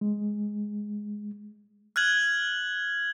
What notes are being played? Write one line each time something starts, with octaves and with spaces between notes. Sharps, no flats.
G#3
F6 F#6 G#6 F#7